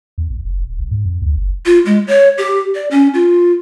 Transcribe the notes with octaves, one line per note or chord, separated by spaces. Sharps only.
E2
A#1
F1
D#1
B1
G#2
F2
D2
F#1
F4
G#3
C#5
G4
D5
C#4
F4